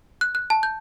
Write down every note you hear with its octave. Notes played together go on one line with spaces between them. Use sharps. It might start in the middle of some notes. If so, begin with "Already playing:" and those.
F#6
F#6
A5
G6